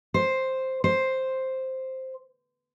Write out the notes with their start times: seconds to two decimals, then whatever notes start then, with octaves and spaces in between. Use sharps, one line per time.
0.14 C5
0.84 C5